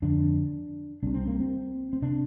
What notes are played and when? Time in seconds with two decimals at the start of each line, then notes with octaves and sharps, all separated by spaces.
0.02 F2 D3 D4
1.03 C2 C3 D4
1.14 C4
1.27 A#3
1.40 C4
1.93 C4
2.02 C3 D4